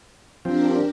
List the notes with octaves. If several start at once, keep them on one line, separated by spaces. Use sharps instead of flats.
F3 C4 D4 G4 A#4